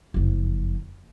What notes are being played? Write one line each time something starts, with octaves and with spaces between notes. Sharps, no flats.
F#1 F2